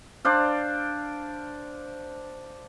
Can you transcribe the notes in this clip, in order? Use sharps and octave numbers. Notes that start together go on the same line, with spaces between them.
D4 C5 D5 F5